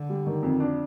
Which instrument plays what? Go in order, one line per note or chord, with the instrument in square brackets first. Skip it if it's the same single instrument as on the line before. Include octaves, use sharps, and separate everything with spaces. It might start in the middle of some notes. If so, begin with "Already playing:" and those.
Already playing: [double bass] D3
[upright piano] G3
D#3
F2
D4